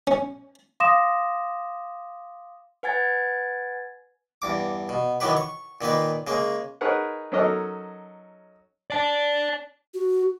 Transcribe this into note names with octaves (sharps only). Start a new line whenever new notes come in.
C#4
F5 C6 D6 D#6 A#6 E7
B4 F#5 G#5 G#6 A6
E2 G2 D6
B2
D#3 E3 F#3 G4 B4
C#6
A#2 D#3 A#3 B4
C#3 G#3 A#3
D#4 G#4 A#4 B4 C#5 F#5
F#3 C#4 D#4 A4 A#4 D#5
D5 A5
F#4